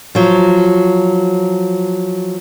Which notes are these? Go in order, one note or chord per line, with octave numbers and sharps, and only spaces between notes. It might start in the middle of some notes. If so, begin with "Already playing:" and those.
F3 F#3